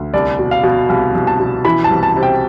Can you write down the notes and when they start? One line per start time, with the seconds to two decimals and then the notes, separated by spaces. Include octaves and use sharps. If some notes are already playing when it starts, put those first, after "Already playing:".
Already playing: D2
0.14 C2 D5
0.39 B2
0.51 F5
0.63 B2
0.89 C2 F5
1.15 C2
1.27 A5
1.40 B2
1.65 E3 B5
1.84 A5
1.90 C2
2.03 A5
2.16 C3
2.23 G5